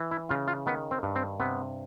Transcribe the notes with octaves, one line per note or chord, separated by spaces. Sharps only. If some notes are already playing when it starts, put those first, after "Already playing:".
Already playing: E3
E4
C#3 F4
F4
D#3 B3
C4
G2
C4
C3 B3